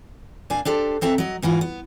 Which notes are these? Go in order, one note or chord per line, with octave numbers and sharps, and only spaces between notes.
A#2 D4 F5 G#5
D4 G4 A4 C5
E3 C4 A4 E5 A#5
F#3 D#5
G#2 E3 F4 F#4
B3